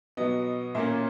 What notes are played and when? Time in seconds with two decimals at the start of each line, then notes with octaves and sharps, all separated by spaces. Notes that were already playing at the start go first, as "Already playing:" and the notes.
0.17 B2 F#3 B3 D#5
0.75 A#2 A#3 C#4 E5